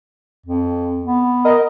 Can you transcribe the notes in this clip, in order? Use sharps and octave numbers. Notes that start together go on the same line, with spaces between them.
F2
B3
A#4 D#5